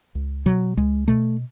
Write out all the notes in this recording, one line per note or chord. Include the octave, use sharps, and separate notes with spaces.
C#2
B2 F#3
C#2 G#3
B2 A3